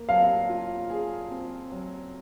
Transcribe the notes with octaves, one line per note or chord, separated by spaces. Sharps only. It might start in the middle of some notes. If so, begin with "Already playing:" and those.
Already playing: A#3
F#3 F5
F4
G#4
C4
F#3